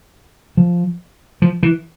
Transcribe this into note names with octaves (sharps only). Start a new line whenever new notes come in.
F3
F3
E3